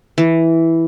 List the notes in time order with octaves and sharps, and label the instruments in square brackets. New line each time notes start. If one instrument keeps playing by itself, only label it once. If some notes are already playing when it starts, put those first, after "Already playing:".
[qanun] E3